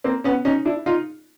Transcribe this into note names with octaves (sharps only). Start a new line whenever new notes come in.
A#3 C4
B3 C#4
C#4 D#4
D4 E4
D#4 F4